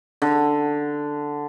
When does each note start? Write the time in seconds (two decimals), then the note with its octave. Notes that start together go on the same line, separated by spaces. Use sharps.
0.22 D3